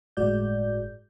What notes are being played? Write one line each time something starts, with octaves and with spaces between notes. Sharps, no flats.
G1 A2 G#3 F#4 D5 G6